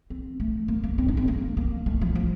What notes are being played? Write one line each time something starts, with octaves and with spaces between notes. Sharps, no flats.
C4
A3
A#3
A#3
C4
D4
C4
A#3
A#3
A3
F3
F3